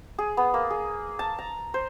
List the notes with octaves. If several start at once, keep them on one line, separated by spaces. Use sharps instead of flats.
G#4
B3
A#3
G#4
A5
A#5
C5